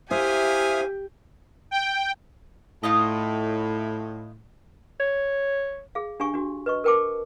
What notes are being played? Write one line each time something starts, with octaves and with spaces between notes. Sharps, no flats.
A#3 E4 G4 C5 E5 F5 G#5 D#6
G5
A2 D#4 F4 D#5
C#5
G#4 F5
D4 G4 F5 G#5 C#6
D4 F#4
B4 D#5 C#6
A#4 B4 G5 A5 D6